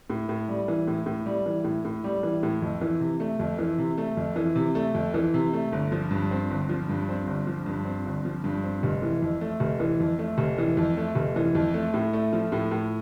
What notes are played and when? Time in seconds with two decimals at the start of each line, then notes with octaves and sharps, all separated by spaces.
0.10 A2
0.29 A2
0.49 G3
0.68 E3
0.87 A2
1.06 A2
1.26 G3
1.46 E3
1.64 A2
1.85 A2
2.04 G3
2.23 E3
2.43 A2
2.62 F2
2.81 E3
3.00 C3
3.20 A3
3.39 F2
3.58 E3
3.78 C3
3.98 A3
4.17 F2
4.36 E3
4.56 C3
4.75 A3
4.95 F2
5.14 E3
5.34 C3
5.53 A3
5.72 G1
5.92 F3
6.11 G2
6.31 C4
6.51 G1
6.69 F3
6.89 G2
7.09 C4
7.27 G1
7.47 F3
7.66 G2
7.85 C4
8.06 G1
8.25 F3
8.44 G2
8.64 C4
8.83 F1
9.02 E3
9.22 F2
9.41 A3
9.60 F1
9.80 E3
10.00 F2
10.19 A3
10.38 F1
10.58 E3
10.77 F2
10.97 A3
11.15 F1
11.36 E3
11.55 F2
11.74 A3
11.94 A2
12.13 A3
12.33 F3
12.52 A2
12.71 A2